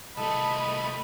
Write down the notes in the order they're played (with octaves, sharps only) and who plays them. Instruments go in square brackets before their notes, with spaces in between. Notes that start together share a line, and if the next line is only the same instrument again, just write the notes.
[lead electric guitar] C2 A3 [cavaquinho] A4 [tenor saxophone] D#5 [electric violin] B5